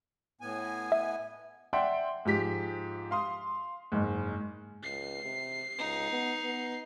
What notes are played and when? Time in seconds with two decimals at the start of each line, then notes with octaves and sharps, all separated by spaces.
0.41 A2 B3 G#5
0.92 E5
1.73 D5 E5 F#5 G5 C6
2.25 G#2 F3 G4 B6
3.11 F5 C6 D#6
3.92 F#1 G#2
4.83 C#2 C7
5.23 C3
5.78 C#2 D#4
6.11 B3
6.43 B3